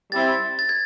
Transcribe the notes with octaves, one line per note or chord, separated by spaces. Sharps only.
G3 C4 E4 A6
A6
G#6